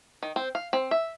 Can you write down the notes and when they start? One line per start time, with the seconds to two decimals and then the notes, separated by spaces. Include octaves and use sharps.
0.23 D#3
0.36 C4
0.55 F5
0.73 C4
0.91 E5